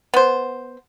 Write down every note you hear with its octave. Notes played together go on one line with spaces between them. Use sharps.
B3 C5